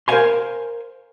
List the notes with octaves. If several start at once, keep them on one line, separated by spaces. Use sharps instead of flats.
A#4 C5 D5 F5 G#5 C6